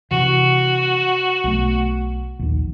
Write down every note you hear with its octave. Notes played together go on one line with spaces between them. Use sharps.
C3 E3 F#4
B1 A3
A#1 D#2